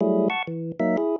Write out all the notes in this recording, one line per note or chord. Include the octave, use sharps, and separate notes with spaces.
F#3 G3 A3 E4 G#4
F#5 A5 C#6
E3
F#3 A#3 D#4 E5
E4 G#4